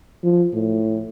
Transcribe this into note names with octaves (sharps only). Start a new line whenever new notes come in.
F3
A2